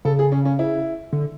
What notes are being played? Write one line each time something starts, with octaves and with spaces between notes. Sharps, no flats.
C#3 A4
G#4
C#4
C#4
E4
D3